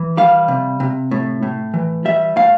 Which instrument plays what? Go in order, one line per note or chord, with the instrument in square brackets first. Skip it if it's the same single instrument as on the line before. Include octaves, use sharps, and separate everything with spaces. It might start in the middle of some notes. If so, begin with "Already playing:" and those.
Already playing: [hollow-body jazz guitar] E3
G3 F5
C3
C3
A2
A2
E3
G3 E5
A2 F5